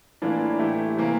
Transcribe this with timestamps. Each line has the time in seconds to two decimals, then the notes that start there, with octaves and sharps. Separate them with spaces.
0.22 A2 E3 A#3 D4 F4
0.59 E3 A3 E4 G4
0.97 C3 E3 A#3